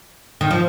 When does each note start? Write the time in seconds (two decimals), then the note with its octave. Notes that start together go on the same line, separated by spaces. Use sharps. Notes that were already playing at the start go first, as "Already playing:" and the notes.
0.41 D#3
0.51 F3